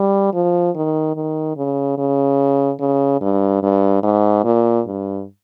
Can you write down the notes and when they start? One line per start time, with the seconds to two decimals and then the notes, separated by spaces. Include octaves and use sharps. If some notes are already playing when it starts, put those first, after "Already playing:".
Already playing: G3
0.34 F3
0.76 D#3
1.16 D#3
1.57 C#3
1.98 C#3
2.80 C#3
3.21 G2
3.63 G2
4.03 G#2
4.44 A#2
4.87 G2